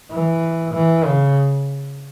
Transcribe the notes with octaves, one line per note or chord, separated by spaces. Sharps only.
E3
E3
C#3